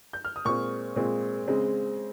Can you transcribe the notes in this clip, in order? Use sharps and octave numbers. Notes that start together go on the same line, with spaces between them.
G6
F6
D#6
A#2 G#3 C4 C#6
A#2 G#3 C4
C#3 G#3 C4